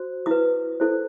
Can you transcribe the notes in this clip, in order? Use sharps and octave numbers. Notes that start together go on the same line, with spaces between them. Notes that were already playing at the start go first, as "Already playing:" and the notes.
Already playing: F#4 C5
E4 B4 D#6
E4 A4 C5